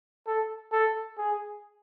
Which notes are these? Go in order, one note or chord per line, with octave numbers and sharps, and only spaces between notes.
A4
A4
G#4